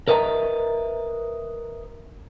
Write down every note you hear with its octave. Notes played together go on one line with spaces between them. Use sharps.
A#4 B4 D#5 E5 G#5 A#5